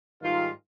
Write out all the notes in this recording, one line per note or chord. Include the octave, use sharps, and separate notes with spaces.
G#2 D#3 G3 F4